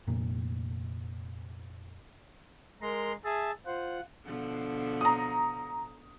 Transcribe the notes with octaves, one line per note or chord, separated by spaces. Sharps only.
F1 A#2
G#3 A#4 A#5 C6
G#4 E5 A5
F4 C5 F#5
B2 D3 F3
A#5 D#6